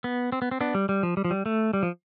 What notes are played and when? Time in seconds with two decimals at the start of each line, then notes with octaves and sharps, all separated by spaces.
0.04 B3
0.32 C4
0.42 B3
0.51 C4
0.61 B3 D4
0.75 G3
0.89 G3
1.03 F3
1.17 G3
1.25 F3
1.31 G3
1.46 A3
1.73 G3
1.83 F3